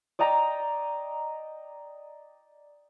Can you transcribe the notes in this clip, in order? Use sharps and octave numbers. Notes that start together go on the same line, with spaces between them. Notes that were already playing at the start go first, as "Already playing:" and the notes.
D5 D#5 G5 A#5